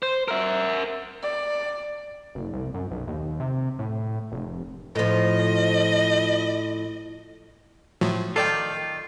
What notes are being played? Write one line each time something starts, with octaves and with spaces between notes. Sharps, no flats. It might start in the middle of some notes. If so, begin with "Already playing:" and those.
C5
A#4 E5
D5
F#1
C2
F#2
B1
D#2
C3
A2
F1
A2 F3 D#5
A2 F3 F#3
D#3 F4 A4 D5 G5